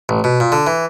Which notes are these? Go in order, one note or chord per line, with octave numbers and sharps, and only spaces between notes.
A1
B2
A#2
D3
E3